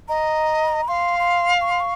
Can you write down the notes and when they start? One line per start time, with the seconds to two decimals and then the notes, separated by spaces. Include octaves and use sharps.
0.08 D#5 A#5
0.88 F5 C6
1.20 C6
1.61 C#6
1.71 C6
1.80 C#6